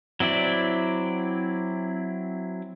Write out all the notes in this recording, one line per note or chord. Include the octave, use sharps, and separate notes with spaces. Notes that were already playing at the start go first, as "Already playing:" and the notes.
F#3 C4 E4 D5